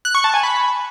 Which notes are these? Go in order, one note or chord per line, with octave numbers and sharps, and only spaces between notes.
F#6
C#6
A5
G#5
B5